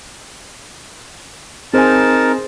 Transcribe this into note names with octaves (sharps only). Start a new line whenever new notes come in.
C4 D#4 G#4 A#4 C5 G#5 A5